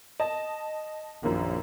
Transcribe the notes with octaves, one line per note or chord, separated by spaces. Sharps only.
D#5 A5
A#1 F#2 A#2 D#3